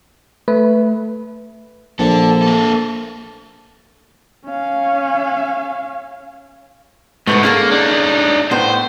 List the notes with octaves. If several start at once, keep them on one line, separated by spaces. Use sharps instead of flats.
A3 B4
A#1 D4 A4
A#3 A4
C#4 F5
G#2 B2 A3 B4 F#5
A#3 C#4 G#4 A4
D4 D#4
A2 B3 C5